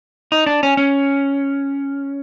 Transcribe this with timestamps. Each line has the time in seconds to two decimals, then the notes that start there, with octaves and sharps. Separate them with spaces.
0.32 D#4
0.46 D4
0.63 C#4
0.77 C#4